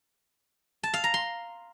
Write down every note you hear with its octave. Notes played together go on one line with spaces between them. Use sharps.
A5
F5
A#5
C6